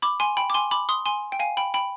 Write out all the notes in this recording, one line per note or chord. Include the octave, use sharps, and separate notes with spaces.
B5 D6
G#5 C6
G5 B5
D6
G#5 C6
B5 D6
C6 D#6
G#5 C6
G5
F5 G#5
G5 B5
G5 B5